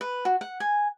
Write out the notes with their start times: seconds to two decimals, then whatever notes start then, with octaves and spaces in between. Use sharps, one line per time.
0.01 B4
0.25 F#4
0.41 F#5
0.60 G#5